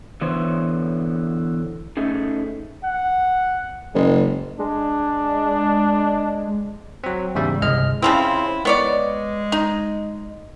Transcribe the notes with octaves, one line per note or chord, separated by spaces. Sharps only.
D3 E3 B3 C5 C#5
A3 C#4 D#4 G#4
F#5
F#1 G#3
G#3 D4
F#3 C4
E2 G#2 C#3 G3 E5
G1 C2 G#3 D#5 F6
C#3 F3 C4 E4
G#3 B3 C#5 D5
D#4